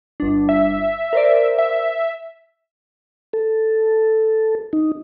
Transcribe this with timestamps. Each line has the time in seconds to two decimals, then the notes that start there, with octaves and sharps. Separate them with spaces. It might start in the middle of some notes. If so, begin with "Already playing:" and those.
0.20 G1 D4
0.49 E5
1.13 A#4 C5 D5
1.58 E5
3.33 A4
4.73 D#4